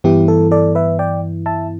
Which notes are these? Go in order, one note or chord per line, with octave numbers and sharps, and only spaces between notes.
G2 E3 B3 E4 G4
A4
A4 D5
B4 E5
D5 G5
E5 A5